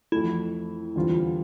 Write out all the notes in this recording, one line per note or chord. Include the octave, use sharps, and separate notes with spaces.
F2 E3 A3 E4
E2 D3 G3 C4 F4